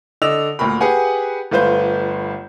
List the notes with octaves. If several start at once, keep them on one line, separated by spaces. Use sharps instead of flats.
D3 D5 D#5 E6 F7
D2 A#2 A#4 B5
G4 G#4 B4 F#5 G#5
G1 A3 F4 B4 C5 G6